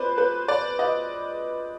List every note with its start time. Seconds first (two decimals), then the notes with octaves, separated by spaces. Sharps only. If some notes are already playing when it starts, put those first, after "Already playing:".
Already playing: F2 B4 C5 D5
0.18 B4
0.48 D5
0.79 D#5